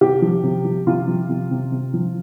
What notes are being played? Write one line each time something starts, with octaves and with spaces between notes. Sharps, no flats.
C3 G4
F3
C3
F3
C3 F4
F3
C3
C3
C3
F3